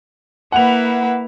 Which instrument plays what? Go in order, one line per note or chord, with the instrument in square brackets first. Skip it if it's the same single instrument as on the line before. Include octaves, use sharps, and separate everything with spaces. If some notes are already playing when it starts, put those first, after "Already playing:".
[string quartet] A#3 E4 B4 [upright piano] F#5 F7